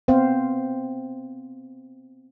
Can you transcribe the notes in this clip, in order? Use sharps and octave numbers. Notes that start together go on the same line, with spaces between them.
B3 C4 C5 F5